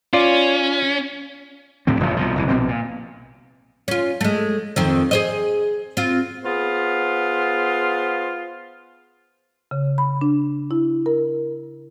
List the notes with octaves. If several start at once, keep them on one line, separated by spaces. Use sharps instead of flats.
C#4 F4 D5
D1 A2 D3 C4
E1 A1 D#2 F3
C2 B2 F3
F#1 C2 E3
A#1 B2 C4
A#2
C#4 F4
G#3 A3
F2 D#3 C4
G#4 C5 D#5
C4 F4
B3 F4 G#4 C5
C#3
B5
D4
E4
A#4